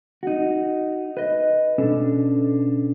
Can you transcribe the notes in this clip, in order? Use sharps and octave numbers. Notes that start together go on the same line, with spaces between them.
D#4 F#4
B4 D#5
B2 C#4 D4 A4